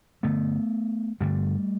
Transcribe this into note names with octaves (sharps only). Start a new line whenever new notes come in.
G2 D3 A3 B3
G2 D3 G3 A3